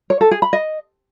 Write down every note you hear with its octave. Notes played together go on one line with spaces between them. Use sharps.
C#5
A4
G#4
B5
D#5